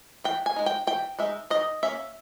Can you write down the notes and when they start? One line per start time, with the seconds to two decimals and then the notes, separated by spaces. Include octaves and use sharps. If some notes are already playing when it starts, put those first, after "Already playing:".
0.24 E3 G5
0.46 G#5
0.56 G#3 D#4
0.66 G5
0.87 E3 G5
1.19 G#3 D#4 E5
1.50 D#3 D#5
1.83 A#3 C#4 E5